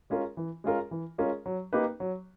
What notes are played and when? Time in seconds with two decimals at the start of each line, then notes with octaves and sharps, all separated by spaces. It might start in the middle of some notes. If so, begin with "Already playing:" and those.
0.10 G#3 C#4 F4 A#4
0.37 E3
0.64 G#3 C#4 F4 A#4
0.91 E3
1.18 G#3 C#4 F4 A#4
1.46 F#3
1.73 A#3 D#4 G4 B4
2.00 F#3